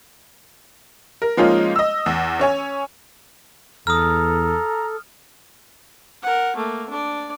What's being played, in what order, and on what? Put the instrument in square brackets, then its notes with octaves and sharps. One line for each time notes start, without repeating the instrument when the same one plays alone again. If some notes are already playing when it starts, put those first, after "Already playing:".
[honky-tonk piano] A#4
F3 G#3 A#3 C#4 D#4 F4
D#5 E6
E2
C#4 C#5 G#5
[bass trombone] E2 [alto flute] A4 [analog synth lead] A#5 [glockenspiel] D#6 F6
[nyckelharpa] A#4 F#5
A3 A#3
D4 D5